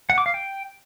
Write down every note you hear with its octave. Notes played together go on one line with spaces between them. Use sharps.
F#5
D6
F5
G5